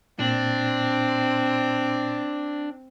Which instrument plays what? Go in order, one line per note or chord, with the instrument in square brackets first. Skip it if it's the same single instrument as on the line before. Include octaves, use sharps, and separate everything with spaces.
[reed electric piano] A#2 [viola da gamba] C4 [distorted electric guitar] D4